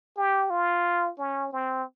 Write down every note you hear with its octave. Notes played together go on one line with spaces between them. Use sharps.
G4
F4
C#4
C4